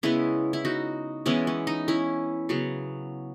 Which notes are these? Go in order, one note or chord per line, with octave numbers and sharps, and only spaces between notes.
C#3 G#3 B3 C#4 E4
E4
D#4 F#4
E3 G#3 B3 C#4 E4
C#4
D#4
C#4 E4
C#3 F#3 B3